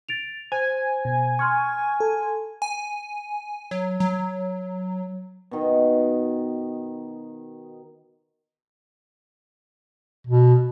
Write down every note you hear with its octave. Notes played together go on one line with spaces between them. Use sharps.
A6 D7 F7
C5 G#5
B2
C6 C#6 F6 G#6
A4
G#5
F#3
F#3
B2 D#3
B2